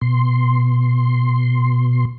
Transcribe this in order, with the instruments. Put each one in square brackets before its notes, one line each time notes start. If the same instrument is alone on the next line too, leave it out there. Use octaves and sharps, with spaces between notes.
[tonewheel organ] B2 C6